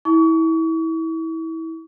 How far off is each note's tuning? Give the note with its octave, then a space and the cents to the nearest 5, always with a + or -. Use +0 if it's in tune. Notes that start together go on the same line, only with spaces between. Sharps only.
E4 -25 C#6 +35